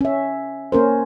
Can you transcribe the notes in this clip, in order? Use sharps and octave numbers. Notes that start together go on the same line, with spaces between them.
C#4 E5
A#3 C#4 A#4 C5